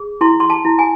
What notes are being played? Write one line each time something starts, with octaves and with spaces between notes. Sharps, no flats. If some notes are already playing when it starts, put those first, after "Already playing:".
Already playing: G#4
E4 C6
C6
A5
E4
G#5